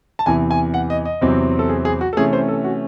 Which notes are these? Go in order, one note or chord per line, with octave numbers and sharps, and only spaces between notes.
A5
E2 C3 E3 G#5
G#5
F#5
D#5
D#5
E2 C3 F#3 C4
A4
G#4
G#4
F#4
A4
C3 E3 A3 C#4 G#4
C5
A4
F#4